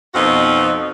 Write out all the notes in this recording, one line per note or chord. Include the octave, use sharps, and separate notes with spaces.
F2 B2 B3 C4 D#4 F#4